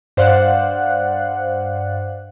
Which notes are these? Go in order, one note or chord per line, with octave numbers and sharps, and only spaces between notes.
G2 C5 D5 F5 F#5 F#6